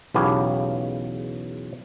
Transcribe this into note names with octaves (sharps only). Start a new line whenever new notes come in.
B1 E2 C#3 B3 G4 C#5